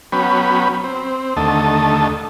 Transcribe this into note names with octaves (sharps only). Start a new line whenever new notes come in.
F#3 B3 C#4 G5 B5
C4
D#2 D3 A3 D#5 A5